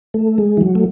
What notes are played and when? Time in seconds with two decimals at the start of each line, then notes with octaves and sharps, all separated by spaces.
0.14 A3
0.38 G#3
0.57 E3
0.61 F#3
0.75 A3